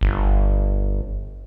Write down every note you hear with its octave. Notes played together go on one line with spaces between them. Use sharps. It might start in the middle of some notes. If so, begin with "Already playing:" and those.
G1